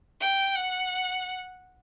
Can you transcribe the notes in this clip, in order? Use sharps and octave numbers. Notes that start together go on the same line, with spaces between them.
G5
F#5